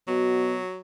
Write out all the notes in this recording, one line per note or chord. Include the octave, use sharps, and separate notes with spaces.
B2 F#3